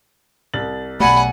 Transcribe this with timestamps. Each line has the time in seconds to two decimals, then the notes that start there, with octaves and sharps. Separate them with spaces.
0.54 C2 A6 F#7
1.00 B1 A3 G4 D5 F#5 G#5 B5